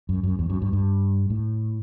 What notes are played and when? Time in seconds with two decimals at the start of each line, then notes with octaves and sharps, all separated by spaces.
0.09 F#2
0.23 F#2
0.39 E2
0.50 F#2
0.62 G2
0.73 G2
1.30 A2